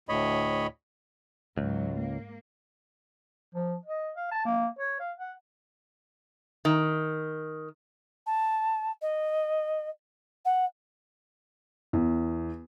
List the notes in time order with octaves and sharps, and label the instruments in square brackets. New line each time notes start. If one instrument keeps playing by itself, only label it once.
[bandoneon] D2 A2 C#5 D#5 B5
[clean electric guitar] C#2 [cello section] G#2 F#3
[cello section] A#3
[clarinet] F3
D#5
F5
A5
A#3
C#5
F5
F#5
[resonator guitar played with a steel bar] D#3
[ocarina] A5
D#5
F#5
[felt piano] E2